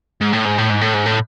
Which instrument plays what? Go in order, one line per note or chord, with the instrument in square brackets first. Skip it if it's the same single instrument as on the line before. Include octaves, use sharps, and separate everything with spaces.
[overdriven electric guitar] G#2
A2
G#2
A2
G#2
A2
G#2
A2